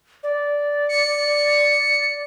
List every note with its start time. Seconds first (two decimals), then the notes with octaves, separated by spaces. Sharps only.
0.23 D5
0.89 C#7